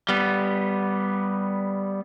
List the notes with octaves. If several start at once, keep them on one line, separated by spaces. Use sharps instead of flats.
G3 B3